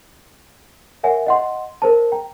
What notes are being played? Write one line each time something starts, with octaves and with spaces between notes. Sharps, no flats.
A#4 C#5 E5 F#5 G#5
D#5 F#5 C6
A#4 C5 A5
G5 A#5